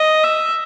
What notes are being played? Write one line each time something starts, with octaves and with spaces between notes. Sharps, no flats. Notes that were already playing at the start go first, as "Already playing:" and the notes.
Already playing: D#5
E5